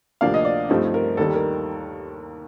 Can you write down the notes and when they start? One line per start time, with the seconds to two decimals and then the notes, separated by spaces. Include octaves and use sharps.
0.21 D2 C3 F3 A#3 D4 F5
0.34 D#5
0.45 D5
0.69 G2 F3 A3 C4 D#4
0.94 A#4
1.17 D#2 D#3 G3 A4
1.34 A#4